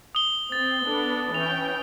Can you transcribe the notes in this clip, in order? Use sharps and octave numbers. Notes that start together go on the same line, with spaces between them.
D#6 G7
C4 A6
B3 D4 A4
E3 C#4 G5 F7